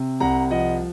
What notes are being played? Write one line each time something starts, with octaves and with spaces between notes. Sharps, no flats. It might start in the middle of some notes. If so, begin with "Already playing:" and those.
Already playing: C3
C2 F#5 A#5
F3 D#5 F#5